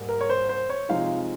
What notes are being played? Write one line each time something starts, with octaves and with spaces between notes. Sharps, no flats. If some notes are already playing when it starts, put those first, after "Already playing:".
Already playing: G#2 G3 A#3
A#4
C#5
C5
C5
C#5
C3 F3 G#3 D#4 F5